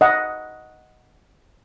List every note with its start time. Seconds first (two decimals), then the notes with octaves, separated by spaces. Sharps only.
0.01 D#5 F#5